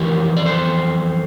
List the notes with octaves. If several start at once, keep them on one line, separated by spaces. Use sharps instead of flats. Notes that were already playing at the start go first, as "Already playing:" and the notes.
Already playing: F2 E3 G4 A#4
D5
A4 C5